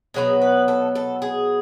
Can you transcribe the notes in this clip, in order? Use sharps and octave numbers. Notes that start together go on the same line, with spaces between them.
B2 F#3 B3 G#4
B4
A4
A4
G#4